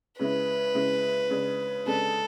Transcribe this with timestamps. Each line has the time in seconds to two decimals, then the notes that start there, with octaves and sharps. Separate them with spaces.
0.19 C#3 G#3 C#4 E4 B4
0.75 C#3 G#3 C#4 E4
1.30 C#3 G#3 D4
1.86 C#3 G#3 D4 A4